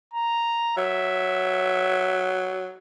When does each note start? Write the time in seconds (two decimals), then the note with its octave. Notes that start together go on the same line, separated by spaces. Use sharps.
0.14 A#5
0.77 F#3 E5